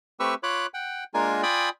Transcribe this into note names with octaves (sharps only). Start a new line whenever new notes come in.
A3 C4 G4 B4 C#6 E6
F4 C#5 B5 D6 F#6
F#5 G5
G#3 A#3 D4 F4 A#4 G#5
F4 D5 G5 G#5 B5 D#6